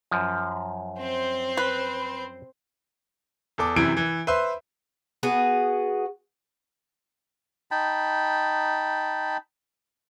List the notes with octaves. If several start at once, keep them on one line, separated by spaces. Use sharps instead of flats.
F#2 F3
C4 C5
B4
E2 A4 D6
F#2 C3 E3 E4 D7
E3
B4 C5 E5 C6
B3 F#4 G#4
D#4 G5 A5 B5